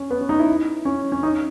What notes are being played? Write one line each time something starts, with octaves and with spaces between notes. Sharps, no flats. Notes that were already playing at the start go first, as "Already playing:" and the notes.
Already playing: C#4
B3
C#4
D#4
E4
C#4
C#4
D#4